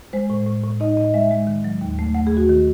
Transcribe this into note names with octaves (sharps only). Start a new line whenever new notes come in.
G#3 C5
A2
A2
A2
D#4 D#5
A2 D#5
G#3 E5
G#3
D#3
F#3
D#2
A3
A3 F#5
D#2 G#4
F#4
D#3